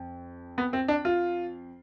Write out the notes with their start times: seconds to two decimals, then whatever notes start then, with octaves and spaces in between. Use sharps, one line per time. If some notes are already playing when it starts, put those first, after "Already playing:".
Already playing: F2
0.58 B3
0.73 C4
0.88 D4
1.05 F4